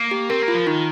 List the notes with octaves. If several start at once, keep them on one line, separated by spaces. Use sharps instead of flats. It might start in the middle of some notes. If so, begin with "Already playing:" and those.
Already playing: A#3
G4
C4 A#4
A#3
F4
F3
D#3 D#4